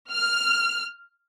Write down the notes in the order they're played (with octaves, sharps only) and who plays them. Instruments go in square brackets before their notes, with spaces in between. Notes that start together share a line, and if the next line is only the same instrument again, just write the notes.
[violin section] F6